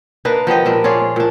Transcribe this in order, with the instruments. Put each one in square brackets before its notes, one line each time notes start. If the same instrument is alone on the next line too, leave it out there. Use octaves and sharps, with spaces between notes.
[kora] A#3 D4 D#4 B4
F3 B3 G4 D#5
A#2 D4 A#4
F4 G#4 C#5 D5
A#2 D4